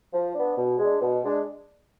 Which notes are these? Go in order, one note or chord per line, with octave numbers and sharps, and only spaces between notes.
F3
B3 D4
B2
G#3 D4
B2
G#3 D4